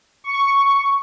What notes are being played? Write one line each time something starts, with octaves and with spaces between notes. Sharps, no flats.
C#6